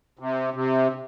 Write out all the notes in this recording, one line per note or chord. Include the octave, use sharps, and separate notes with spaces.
C3
C3